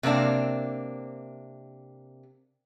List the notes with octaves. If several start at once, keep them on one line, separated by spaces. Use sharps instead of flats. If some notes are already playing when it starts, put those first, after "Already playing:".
C3 A#3 C4 D4 F5